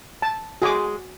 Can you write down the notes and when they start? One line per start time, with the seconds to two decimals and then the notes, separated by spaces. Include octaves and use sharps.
0.22 A5
0.62 G#3 F#4 G#4 G#5 D6